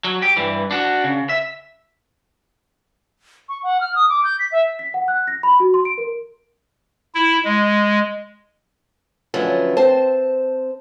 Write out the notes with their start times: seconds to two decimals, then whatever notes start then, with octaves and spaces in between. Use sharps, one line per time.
0.04 F#3
0.22 G4
0.36 G2 E3
0.71 D4 F#4
1.04 C#3
1.29 E5
3.49 C#6
3.63 F#5
3.81 F6
3.95 D#6
4.09 D6
4.24 G6
4.39 B6
4.52 E5
4.79 B6
4.94 F#5
5.08 F#6
5.27 A#6
5.43 B5
5.60 F#4
5.74 C6
5.85 D7
5.98 A#4
7.14 E4
7.45 G#3
9.34 D3 F3 F#3 A3 B3 C#4
9.77 C4 C5 A5